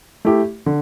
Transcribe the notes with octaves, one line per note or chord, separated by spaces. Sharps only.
A3 E4 G4
D3